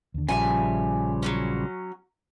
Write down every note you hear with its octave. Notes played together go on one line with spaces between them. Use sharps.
D#2 D3
A#1 C#3 F3 G3 E5 F#5 G#5
F#3 B3 C#4